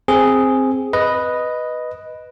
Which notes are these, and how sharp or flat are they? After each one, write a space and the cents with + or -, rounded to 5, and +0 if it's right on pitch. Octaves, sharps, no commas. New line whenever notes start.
C4 +0 G#4 +0
B4 +0 D#5 +0